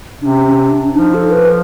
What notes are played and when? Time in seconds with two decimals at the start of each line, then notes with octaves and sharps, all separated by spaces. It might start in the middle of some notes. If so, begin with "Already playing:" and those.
0.21 C3 D4
0.26 C#4
0.46 C#4
0.70 D4
0.95 F3 D#4
1.14 A4
1.31 B4